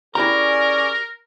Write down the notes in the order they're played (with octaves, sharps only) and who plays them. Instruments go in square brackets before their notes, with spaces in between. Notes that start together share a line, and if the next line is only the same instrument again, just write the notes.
[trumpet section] C#4 G#4 D5 [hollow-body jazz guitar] E4 G4 A#5 [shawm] A#4